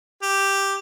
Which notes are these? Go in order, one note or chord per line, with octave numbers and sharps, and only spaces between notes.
G4